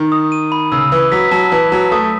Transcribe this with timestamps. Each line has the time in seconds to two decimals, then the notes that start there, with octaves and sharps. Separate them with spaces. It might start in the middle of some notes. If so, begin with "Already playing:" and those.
Already playing: D#3
0.12 D#6
0.32 D#7
0.52 B5
0.72 C#3 E6
0.92 E3 E6
1.12 F#3 B6
1.31 F#3 A5
1.52 E3 A5
1.72 F#3 A5
1.92 A3 D#6